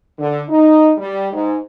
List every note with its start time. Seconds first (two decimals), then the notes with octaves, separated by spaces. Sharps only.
0.19 D3
0.49 D#4
0.98 G3
1.33 G#2